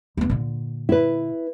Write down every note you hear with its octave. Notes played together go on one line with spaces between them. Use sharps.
D#2 B3
A#2 D3
E4 B4